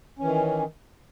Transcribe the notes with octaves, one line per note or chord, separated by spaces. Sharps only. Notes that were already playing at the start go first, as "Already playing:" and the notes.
D#3 E3 C#4